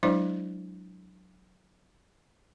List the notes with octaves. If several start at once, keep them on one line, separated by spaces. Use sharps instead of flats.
F#3 G#3 D4 E4 C5 D5